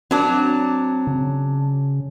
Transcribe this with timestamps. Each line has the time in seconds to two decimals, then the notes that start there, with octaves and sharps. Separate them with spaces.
0.11 F#3 C4 D4
1.07 C#3